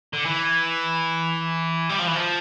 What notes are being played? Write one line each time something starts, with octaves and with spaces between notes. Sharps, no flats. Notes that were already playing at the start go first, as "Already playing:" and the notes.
D3
E3
G3
F3
E3
F3